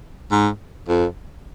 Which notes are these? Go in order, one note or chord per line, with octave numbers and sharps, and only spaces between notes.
G#2
F2